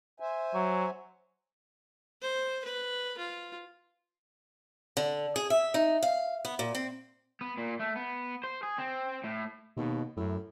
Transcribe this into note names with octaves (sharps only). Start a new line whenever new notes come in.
C5 E5 G#5
F#3
C5
B4
F4
D3
G#4
E5
D#4
F5
B3
A#2
C4
B3
A#2
A3
B3
C5
G#4
C4
A2
D#2 B2
F#2 A2